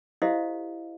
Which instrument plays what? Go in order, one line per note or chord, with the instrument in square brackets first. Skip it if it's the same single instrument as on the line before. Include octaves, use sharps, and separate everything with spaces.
[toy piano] E4 G4 A4 C5 D#5 F5